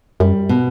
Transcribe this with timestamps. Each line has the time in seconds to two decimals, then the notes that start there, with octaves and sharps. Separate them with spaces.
0.20 F#2 G3
0.49 B2